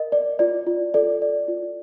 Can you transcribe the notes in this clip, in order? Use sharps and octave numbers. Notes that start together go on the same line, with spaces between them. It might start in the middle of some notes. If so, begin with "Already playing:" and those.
Already playing: A#4 D#5
D5
F4 D5
F4
A4 D5
D5
F4